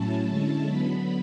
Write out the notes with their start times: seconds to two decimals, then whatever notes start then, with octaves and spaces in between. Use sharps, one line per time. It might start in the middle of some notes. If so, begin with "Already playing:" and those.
Already playing: A2 F#3 C#4 E4 A5
0.27 D3 G#3 C#4 E4
0.66 D3 F#3 B3 B5